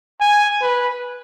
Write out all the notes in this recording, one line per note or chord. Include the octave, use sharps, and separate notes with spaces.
G#5
B4